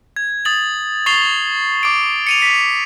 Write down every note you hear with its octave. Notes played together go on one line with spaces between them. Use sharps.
G#6
D#6 A6 F#7
C#6 A6 C7 F7 G7
C#6 D6 D7
C#7 D#7 F7
B6